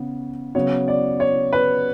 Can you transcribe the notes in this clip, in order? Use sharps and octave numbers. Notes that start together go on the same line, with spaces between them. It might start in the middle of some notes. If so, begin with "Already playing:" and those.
Already playing: C#3 B3
C#3 F#3 B3 C#5
D5
C#5
B4